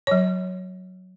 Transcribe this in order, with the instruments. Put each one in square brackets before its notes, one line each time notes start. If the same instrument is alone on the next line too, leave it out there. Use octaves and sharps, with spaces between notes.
[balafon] F#3 C#5